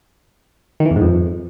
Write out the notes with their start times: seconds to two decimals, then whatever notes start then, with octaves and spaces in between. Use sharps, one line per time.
0.80 D#3
0.85 E3
0.91 E2
0.96 G#2
1.01 F2